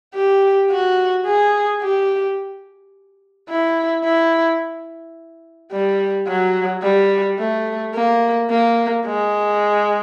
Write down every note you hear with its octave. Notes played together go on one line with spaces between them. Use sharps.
G4
F#4
G#4
G4
E4
E4
G3
F#3
G3
A3
A#3
A#3
G#3